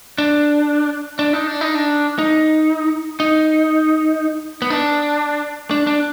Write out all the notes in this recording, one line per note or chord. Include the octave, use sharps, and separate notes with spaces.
D4
D4
D#4
D4
D#4
D4
D#4
D#4
B3
D4
D4
D4